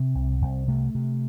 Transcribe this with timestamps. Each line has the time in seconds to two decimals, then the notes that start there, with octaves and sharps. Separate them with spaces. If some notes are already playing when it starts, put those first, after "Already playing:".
Already playing: C3 C4
0.15 C2
0.42 C2
0.68 C3 A3
0.95 C3